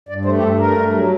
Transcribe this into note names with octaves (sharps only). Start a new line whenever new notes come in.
G2 D5
A3 C5
G4
G2 A4
A3 A#4
G2
F#3